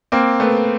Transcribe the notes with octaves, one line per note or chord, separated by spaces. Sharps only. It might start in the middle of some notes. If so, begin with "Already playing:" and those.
A#3 C4
A3 B3